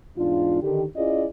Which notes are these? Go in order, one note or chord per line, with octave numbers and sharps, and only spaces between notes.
E2 G#2 D4 F4
D3 D#3 G4
C#4 E4 F4 G#4 D5 D#5